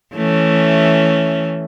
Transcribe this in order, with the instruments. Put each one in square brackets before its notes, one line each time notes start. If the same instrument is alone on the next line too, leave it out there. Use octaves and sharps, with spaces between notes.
[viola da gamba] E3 A3 C#4